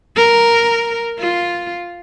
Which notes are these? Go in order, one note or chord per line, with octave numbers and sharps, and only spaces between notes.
A#4
F4